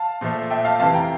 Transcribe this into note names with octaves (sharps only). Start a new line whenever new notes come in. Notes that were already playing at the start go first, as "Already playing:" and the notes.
Already playing: F5 A5
A#2 F3 A3
E5 G5
F5 A5
F2 C3 E3 F5 A5
G5 A#5